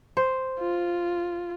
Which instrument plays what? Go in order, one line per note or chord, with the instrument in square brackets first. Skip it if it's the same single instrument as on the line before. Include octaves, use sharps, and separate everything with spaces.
[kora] C5
[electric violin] F4